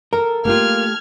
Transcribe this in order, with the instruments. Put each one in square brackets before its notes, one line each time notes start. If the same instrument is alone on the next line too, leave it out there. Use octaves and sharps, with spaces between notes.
[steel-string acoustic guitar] A4 [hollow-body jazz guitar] A#4
[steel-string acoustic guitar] A3 G4 A4 [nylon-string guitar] A#3 F4 [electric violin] F6 G#6